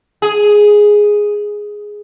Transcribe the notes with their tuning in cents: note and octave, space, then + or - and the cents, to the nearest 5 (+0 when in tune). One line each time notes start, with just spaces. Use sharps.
G#4 +0